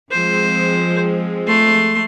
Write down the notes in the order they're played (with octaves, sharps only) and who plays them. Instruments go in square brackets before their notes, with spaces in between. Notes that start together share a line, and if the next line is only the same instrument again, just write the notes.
[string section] F3 G#3 C4 [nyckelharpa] C5
[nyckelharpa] A3 C6